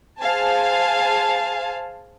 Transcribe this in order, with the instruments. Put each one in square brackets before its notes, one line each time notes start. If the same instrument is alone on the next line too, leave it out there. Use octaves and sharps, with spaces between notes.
[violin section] G#4 C5 F5 G#5 A5